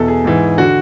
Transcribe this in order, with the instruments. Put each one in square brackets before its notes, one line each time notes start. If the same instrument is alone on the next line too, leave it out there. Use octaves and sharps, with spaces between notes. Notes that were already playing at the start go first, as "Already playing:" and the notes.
Already playing: [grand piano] E2 B2 A4
G#4
G#2 E3
D3 F#4